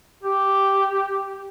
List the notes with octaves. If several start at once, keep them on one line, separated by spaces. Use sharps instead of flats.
G4